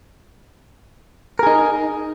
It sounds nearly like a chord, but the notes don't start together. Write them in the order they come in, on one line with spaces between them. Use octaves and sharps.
A#4 G#4 D#4